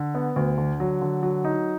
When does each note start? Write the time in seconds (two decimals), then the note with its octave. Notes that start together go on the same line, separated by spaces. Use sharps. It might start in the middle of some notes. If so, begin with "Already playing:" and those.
Already playing: D3
0.15 B3
0.36 D2
0.58 D3
0.80 F#3
1.01 D3
1.23 F#3
1.44 D#4